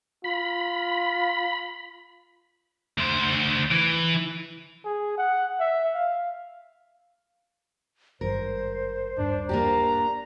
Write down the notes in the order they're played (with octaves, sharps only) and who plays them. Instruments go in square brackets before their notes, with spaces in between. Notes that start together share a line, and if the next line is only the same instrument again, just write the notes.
[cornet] F4 [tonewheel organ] B5
[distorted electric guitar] D2 C5
E3
[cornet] G#4
F#5
E5
F5
[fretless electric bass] G#1 G2 [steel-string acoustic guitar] A#4 [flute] C5
[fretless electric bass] D#1 G2 [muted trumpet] D4
[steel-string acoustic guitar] A#3 D4 G4 [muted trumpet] A#5